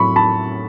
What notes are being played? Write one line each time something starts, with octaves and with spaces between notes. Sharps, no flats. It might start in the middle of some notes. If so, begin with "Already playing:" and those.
Already playing: A2 F#3 A3 C4 B5 C#6
A5 B5